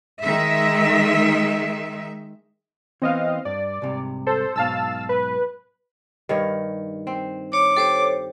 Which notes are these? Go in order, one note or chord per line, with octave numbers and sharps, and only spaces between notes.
D#3 G#3 E5
E3 B3 C4 D#5 F5
G2 D5
C2 G#2 C3
A4 C5
B1 G#2 B2 F5 A5 E6
B4
G2 D#3 C#5
C4
C#5 D6
G4 A4 C5 C#5